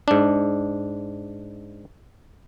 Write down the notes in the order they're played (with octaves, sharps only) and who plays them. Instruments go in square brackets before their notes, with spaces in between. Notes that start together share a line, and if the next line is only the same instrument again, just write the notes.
[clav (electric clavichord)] G#2 D4